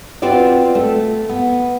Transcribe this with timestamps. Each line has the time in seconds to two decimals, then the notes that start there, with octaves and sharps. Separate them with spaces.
0.22 C4 F4 F#4 B4 D5
0.75 A3
1.29 B3